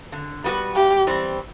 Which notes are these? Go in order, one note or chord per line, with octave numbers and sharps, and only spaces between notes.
D3
G3 B3 F#4 B4
G2 G4
E3 G3 C4